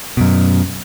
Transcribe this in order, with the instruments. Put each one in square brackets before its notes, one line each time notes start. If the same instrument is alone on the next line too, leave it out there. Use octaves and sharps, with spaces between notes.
[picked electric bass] F#2 B2